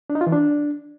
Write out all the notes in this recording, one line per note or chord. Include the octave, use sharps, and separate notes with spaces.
D4
D#4
F4
E3
D4